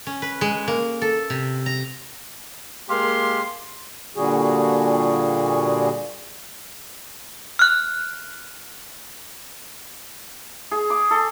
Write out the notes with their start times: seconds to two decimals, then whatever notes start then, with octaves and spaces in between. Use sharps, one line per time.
0.07 C#4
0.22 B4
0.41 G#3
0.68 A#3
1.02 A4
1.30 C3
1.66 A#5
2.89 G#3 A#3 G4 F5 C6
4.16 A#2 D3 G3 F#4 G#4
7.59 F6 F#6
10.71 G#4
10.90 D6
11.11 A4